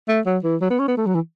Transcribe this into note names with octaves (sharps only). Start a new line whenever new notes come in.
A3
F#3
E3
F#3
B3
C#4
B3
A3
F#3
E3